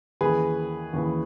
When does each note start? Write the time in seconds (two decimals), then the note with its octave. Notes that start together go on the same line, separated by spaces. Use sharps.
0.21 D#2 C#3 E3 G#4 B4
0.93 D#2 C#3 E3